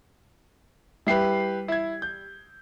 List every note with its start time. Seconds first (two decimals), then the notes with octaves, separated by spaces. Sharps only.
1.07 G3 E4 G4 B4 C7
1.68 E4 G#6
2.02 G6